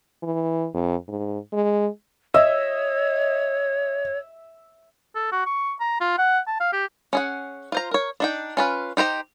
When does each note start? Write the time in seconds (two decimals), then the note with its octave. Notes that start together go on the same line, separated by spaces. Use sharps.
0.23 E3
0.74 F2
1.08 G#2
1.53 G#3
2.34 C#5 D#5 E5
5.15 A4
5.32 F#4
5.46 C#6
5.80 A#5
6.01 F4
6.18 F#5
6.47 A5
6.60 F5
6.73 G4
7.13 C#4 G#4 F#5
7.72 F4 C5 A#5
7.91 A#4 C#5
8.20 D4 D#4 G5
8.57 C#4 F4 B4
8.97 D#4 G4 C5 A#5